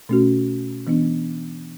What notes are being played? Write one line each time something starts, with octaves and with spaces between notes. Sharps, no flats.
B2 A3 C#4 F#4
E3 B3 D4